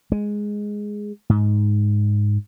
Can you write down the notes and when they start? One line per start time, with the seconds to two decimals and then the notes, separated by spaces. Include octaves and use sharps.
0.12 G#3
1.30 G#2